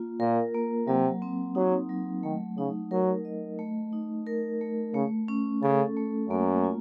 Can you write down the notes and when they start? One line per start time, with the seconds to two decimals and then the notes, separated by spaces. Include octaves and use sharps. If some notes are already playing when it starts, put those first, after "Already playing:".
Already playing: A#3 F4
0.20 A#2 A#4
0.54 A#3
0.88 C3 F#3
1.22 C4
1.55 F#3 D#4
1.89 F#3
2.23 D#3 A3
2.58 C#3 D#4
2.91 F#3 A#4
3.25 D#5
3.59 A3
3.93 D#4
4.27 A#4
4.61 A3
4.94 C#3 A3
5.28 C#4
5.62 C#3 A4
5.97 A3
6.30 F#2 A#3
6.64 F4